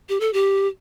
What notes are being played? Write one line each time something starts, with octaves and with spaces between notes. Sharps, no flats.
G4
A4
G4